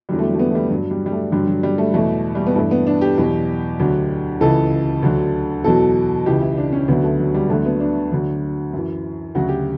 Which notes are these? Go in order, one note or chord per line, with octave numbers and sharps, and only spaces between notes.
E2 D3 F#3 G3
A3
G3
A3
B3
A3
G3
G2 F#3
G3
G3
A3
G2 D3 F#3 G3
F#3
G3
A3
E2 B2 F#3 A3
G3
B3
G2 E3 A3
B3
D4
G4
E2 B2 F#3
D2 D3 F#3
C#2 C#3 E3 A4
D2 D3 F#3
E2 B2 F#3 A4
C#2 C#3 E3 G4
E4
D4
C#4
D2 D3 F#3 B3
A3
F#3
G3
D2 D3 F#3 A3
B3
D4
D2 D3 F#3
F#2 E3
D2 C#3 F#3 F#4
G4